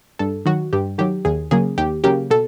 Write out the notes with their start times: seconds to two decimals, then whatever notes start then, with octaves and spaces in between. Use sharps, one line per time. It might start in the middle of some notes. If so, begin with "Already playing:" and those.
0.19 G2 A4
0.46 D#3 F#3 F#4
0.73 G2 G4
0.98 D#3 F#3 G4
1.25 D#2 G#4
1.51 C#3 F#3 A#3 G#4
1.78 D#2 G4
2.04 C#3 F#3 A#3 G4
2.30 B2 A4